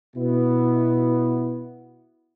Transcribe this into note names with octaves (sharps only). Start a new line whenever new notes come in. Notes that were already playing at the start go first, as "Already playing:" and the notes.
B2 B3 E4